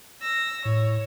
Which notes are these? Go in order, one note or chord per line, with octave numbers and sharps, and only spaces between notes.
E6 A#6
A2 C#5